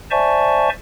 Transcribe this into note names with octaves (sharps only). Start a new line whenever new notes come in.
C5 D5 E5 G#5 A5 C#6